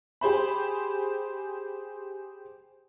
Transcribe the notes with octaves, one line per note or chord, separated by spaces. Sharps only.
G4 G#4 C5 B5